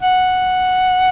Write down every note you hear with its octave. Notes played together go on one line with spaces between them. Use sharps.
F#5